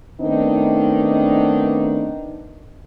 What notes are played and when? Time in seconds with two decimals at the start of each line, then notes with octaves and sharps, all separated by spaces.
0.20 D#3 A3 B3 C4 D4 D#4